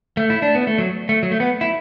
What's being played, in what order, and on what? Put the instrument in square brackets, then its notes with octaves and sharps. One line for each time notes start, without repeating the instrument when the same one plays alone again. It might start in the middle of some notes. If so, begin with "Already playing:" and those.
[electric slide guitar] A3
E4
D4
B3
A3
F#3
A3
F#3
A3
B3
E4